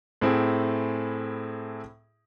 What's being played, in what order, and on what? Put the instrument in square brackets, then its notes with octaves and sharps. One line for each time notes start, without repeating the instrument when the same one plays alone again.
[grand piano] A2 C4 E4 G#4